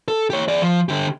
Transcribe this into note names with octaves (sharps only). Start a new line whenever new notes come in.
A4
G4 C#5
G#4 D5
F3
D3 G4